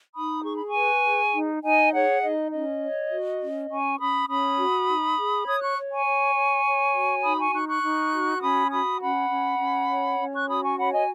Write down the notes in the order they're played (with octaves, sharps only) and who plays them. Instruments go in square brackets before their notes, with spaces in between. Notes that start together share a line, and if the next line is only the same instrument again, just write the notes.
[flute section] D#4 B5 D#6
G#4 C#6
B5
G#5 C#6
B4
G#4
D#4
D#4 D#5 G#5
G#4 C#5 F#5
D#4 D#5
C#4 D#5
C#5
F#4
C#4
C#4 G#5 C#6
C#4 B5 D#6
C#4 B5 D#6
F#4
D#4
G#4
C#5 D#6 G#6
C#6 F#6
C#5
G#5 C#6
C#5
C#5
C#5
F#4
D#4 B5 D#6
G#5 C#6
D#4 C#6 F#6
C#6 F#6
D#4
F#4
C#4 B5 D#6
F#4 B5 D#6
C#4 F#5 B5
C#4
C#4
C#5
C#4
C#6 F#6
F#4 B5 D#6
G#5 C#6
C#5 F#5 B5
D#5 G#5